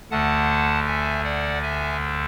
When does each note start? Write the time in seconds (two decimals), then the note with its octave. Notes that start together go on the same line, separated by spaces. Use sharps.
0.11 D2 D3 A3 F#5 A5
0.86 E5 G#5
1.24 D5 F#5
1.62 E5 G#5